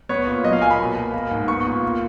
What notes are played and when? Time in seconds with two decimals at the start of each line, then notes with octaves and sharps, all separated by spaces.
0.09 B3 C#5
0.27 A#2
0.44 F#3 D#5
0.53 F5
0.61 A#3 G#5
0.71 B5
0.79 B2
0.97 A#3
1.14 A#3
1.31 G#2
1.48 B3 C#6
1.66 A#2
1.83 A#3